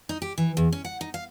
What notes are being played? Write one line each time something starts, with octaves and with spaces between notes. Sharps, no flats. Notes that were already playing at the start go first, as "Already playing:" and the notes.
D#4
G4
E3
E2
C#4
F#5
D#4
F5